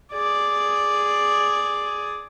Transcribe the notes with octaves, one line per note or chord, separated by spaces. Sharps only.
G#4 D5